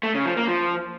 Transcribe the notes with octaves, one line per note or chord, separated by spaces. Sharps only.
A3
C#3
F3
A#3
F3